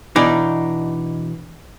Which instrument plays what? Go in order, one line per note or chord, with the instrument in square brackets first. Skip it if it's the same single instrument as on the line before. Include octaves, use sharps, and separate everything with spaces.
[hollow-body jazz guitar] B2 E3 D4 D#4